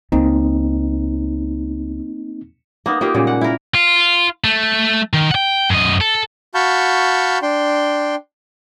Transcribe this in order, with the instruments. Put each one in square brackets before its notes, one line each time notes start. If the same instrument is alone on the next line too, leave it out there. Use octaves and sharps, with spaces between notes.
[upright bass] C#2 [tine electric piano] A#3 C4 D#4
[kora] A#3 B3 D#4
A#3 D#4 F4 G4
A#2 C#3 G3 G#3
F#5
E4 A#4
[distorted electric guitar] F4
A3
D#3
F#5 G5
F#2 D#5
A4
[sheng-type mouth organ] F#4 F5 A5 B5 C#6 G6
D4 G5 C6